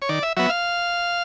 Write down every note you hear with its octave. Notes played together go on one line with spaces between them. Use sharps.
C#5
D#3 D5
E5
F#3 B3 E5
F5